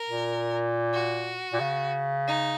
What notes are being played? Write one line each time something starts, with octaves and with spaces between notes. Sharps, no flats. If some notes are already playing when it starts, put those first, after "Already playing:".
Already playing: A#4
A#2
F#4
A#2
C#3
D#4